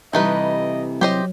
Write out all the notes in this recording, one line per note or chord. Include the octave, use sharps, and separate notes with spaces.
C3 E3 G3 A3 D#4 B4 D#5
F#3 G4 C5 D#5